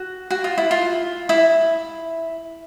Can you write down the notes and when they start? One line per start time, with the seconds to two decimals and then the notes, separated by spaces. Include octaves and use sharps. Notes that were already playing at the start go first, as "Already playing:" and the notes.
Already playing: F#4
0.31 F#4
0.44 F4
0.58 E4
0.71 F4
1.29 E4